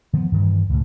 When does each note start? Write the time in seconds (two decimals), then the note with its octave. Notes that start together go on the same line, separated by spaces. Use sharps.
0.13 D#3 F3 A3 B3
0.32 G2 D#3 E3 G3
0.69 C#2 A2